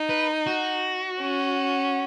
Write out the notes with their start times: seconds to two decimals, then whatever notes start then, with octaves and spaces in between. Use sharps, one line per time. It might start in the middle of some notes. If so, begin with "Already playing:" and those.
Already playing: D#4
0.09 B4
0.46 F#4
1.22 C#4